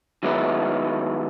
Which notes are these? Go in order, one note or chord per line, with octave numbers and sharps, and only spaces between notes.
D#3 F#3 G#3 B3 D#4 E4